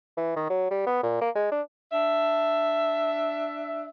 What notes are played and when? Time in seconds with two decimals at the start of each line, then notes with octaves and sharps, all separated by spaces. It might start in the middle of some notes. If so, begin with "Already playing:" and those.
0.17 E3
0.36 D#3
0.50 F#3
0.70 G3
0.86 B3
1.03 A#2
1.21 A#3
1.35 G#3
1.52 D4
1.92 D4 E5